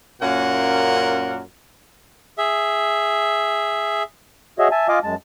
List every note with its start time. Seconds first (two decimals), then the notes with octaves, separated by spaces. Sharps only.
0.22 F#2 A#2 A#3 C#4 A#4 F#5
2.38 G#4 E5
4.59 F#4 G#4 C#5 D#5 E5
4.71 E5 G#5 A5
4.89 F4 D#5 F5 G#5 D6
5.03 F#2 G#3 A5